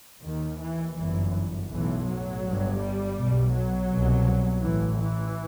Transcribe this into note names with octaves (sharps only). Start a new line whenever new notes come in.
D#2 D#3
E3
G1 F#2 E3
B1 A2 E3
F#3
G1 G2
G3
B1 B2
F#3
C2 B2
A1 A2 E3
E3